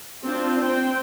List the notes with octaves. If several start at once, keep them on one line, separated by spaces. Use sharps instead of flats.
C4 D4 F4
C4 G5